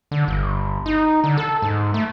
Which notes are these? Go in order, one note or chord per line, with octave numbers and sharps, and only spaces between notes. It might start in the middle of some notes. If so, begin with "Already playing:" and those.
D3
G1
D#4
D3
A4
G#2
A3